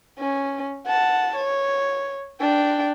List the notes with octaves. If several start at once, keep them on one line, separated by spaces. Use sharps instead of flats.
C#4
F#5 A5
C#5
D4 G5